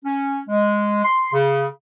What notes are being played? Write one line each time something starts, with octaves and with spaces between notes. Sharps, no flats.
C#4
G#3
C6
C#3